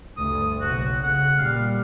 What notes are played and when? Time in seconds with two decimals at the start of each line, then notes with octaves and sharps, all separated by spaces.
0.17 D2 G2 D#6
0.61 F#1 B1 F#4
1.03 C#3 F#5
1.38 A#2 G3 F5